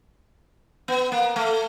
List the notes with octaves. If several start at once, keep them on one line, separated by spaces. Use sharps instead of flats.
B3
A#3
A3